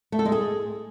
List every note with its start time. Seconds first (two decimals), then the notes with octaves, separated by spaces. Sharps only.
0.12 A3
0.19 A4
0.25 G#3
0.32 G#4